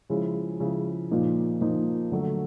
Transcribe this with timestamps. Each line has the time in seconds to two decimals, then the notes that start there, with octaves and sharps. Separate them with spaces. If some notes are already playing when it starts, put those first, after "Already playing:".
0.10 C#3 F3 G#3 C#4 E4
0.60 C#3 F3 G#3 C#4 E4
1.11 A#2 F3 A#3 D#4
1.61 A#2 F3 A#3 D#4
2.11 D3 F#3 A3